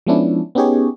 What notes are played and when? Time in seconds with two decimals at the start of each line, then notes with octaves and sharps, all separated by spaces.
0.07 F3 G#3 B3 C#4 D4 E4
0.55 B3 C#4 D#4 G4 G#4 C#5